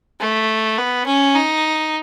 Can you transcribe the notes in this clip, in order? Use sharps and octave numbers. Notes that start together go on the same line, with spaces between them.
A3
B3
C#4
D#4